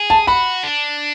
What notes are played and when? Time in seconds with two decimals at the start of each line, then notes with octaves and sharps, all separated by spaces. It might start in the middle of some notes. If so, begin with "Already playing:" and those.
Already playing: G#4
0.10 A5
0.27 F#4 B5
0.63 D4